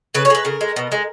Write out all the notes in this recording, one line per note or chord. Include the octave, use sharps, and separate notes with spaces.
C#3 B4
C#5
G#3 B4
C#3 A#4
G#3
B2
G#3